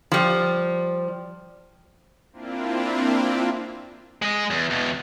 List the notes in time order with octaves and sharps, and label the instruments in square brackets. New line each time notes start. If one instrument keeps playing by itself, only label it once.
[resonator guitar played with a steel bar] F3 G3
[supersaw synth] A#3 C4 D4 E4 F4
[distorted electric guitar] G#3 D#5
E2
E2 B2